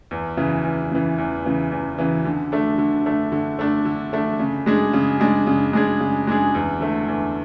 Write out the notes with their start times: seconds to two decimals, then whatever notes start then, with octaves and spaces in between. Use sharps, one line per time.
0.11 E2
0.37 C#3 E3
0.64 E2
0.91 C#3 E3
1.18 E2
1.45 C#3 E3
1.72 E2
1.98 C#3 E3
2.25 D3
2.52 A3 D4
2.78 D3
3.06 A3 D4
3.32 D3
3.59 A3 D4
3.85 D3
4.13 A3 D4
4.40 C#3
4.66 G#3 D4 G#4
4.93 C#3
5.20 G#3 D4 G#4
5.47 C#3
5.73 G#3 D4 G#4
6.00 C#3
6.27 G#3 D4 G#4
6.55 E2
6.81 D3 A3
7.08 E2